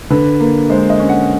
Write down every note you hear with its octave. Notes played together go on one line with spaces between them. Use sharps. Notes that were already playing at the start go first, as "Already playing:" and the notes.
D3 B4
A#3
G#3 C5
D#5
C#4
F#5